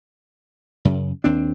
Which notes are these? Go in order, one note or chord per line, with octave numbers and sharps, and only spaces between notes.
F#2 C#3
D#2 C4 D4